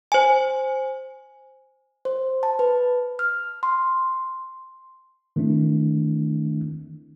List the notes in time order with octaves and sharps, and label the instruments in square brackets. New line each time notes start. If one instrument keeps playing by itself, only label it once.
[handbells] C5 G#5
[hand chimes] C5
A5
B4
F6
C6
[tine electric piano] D#3 A3 C4 D4 E4